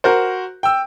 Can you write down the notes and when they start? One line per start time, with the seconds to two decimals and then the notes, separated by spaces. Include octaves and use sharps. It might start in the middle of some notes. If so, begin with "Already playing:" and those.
0.04 F#4 A#4 C5
0.63 G5 E6